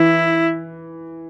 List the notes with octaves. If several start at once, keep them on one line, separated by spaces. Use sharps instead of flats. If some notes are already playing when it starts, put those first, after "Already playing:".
Already playing: E3 E4